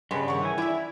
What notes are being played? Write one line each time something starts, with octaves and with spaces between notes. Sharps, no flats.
G2 C#3 G3 G#3 B3
D#3 C#5 F#5
E3 G#5
E4 D5 E5